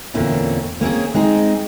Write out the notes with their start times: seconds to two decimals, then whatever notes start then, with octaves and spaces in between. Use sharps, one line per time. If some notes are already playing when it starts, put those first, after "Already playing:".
0.14 E2 A#2 D3 A#3 C4 C#4
0.81 A#3 C4 C#4 G#4
1.14 G#3 C4 D#4 G#4